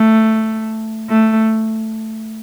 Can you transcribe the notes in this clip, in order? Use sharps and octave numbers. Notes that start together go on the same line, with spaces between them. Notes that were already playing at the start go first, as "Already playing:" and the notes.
Already playing: A3
A3